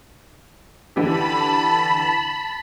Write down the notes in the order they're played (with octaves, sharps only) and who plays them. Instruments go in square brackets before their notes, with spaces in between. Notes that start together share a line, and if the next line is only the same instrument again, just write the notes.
[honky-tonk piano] D3 E3 G4 [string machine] A5 B5